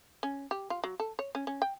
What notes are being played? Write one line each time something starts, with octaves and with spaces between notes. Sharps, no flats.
C#4
G4
F4
F#3
A4
C#5
C#4
C#4
G5